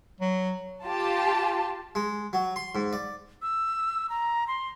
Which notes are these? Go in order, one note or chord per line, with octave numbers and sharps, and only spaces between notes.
F#3
F4 G4 A5
G#3
F#3
C6
G#2
D5
E6
A#5
C6